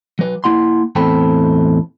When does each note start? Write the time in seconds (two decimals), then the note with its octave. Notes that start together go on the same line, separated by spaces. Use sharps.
0.19 F#3 B4
0.44 A#3 E4 F#5 C6
0.96 E2 A2 C4 A4 G5 B5